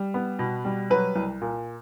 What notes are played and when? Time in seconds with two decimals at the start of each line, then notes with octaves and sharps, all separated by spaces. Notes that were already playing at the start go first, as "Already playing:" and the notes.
Already playing: G3
0.14 B3
0.39 B2
0.65 G3
0.90 F#3 B4
1.16 C2
1.41 A#2